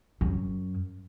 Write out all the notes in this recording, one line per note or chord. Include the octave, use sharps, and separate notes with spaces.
F#2